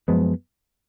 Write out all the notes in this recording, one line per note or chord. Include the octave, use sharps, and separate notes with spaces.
F#2 F3 G#3 B3